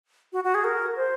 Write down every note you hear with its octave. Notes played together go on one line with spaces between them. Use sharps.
F#4
F#4
G#4
A#4
C5